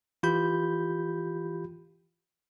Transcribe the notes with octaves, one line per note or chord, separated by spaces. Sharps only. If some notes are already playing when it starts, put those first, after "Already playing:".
E3 F4 G4 B5 G6